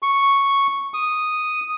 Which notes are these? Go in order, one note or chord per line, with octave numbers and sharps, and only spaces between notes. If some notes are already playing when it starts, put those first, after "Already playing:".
C#6
D#6